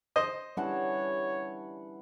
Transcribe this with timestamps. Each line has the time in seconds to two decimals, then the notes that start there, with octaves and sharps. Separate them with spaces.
0.16 C5 D#5
0.57 E3 G3 C#4 D4 C#5 F#5 A5